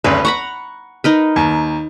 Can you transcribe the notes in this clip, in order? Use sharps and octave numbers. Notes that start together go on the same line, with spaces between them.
G#1 D2 C#4 B4
F#5 A#5 B5 C#6
D#4 A#4 B4
D#2